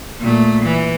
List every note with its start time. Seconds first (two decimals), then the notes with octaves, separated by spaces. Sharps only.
0.20 A#2 A3
0.64 E3